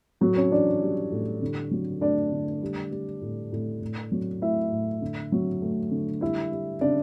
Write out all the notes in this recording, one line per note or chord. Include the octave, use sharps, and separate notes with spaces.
A2 F#3 F#4
C#4 C#5
E3 D4 D5
G3
A2
D3
F#3
A3 D4 D5
D3
G3
G3
A2
A2
A2
F#3
A3 E4 E5
A2
D3
F#3
A3
D3
G3 E4 E5
G3
C#3 D4 D5